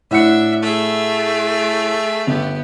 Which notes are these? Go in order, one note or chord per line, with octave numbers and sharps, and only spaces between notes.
A2 D4 E5 F#5 C#7
A3 G#4 E5
G1 B3 G4